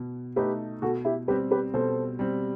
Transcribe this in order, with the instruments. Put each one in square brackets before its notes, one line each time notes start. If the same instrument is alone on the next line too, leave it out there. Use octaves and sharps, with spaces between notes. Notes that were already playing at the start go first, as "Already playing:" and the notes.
Already playing: [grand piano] B2
[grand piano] A3 D#4 [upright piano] G4 B4
[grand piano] B2 [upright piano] F#4 A4
[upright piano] E4 G4
[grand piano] G3 C4 [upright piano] G4 B4
[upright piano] G4 B4
[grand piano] B2 [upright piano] A4 C5
[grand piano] G3 C4